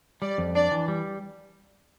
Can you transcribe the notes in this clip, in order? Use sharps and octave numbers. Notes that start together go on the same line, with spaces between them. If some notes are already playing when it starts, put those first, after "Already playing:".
G3 D5
F2
D4 D5
E3
G3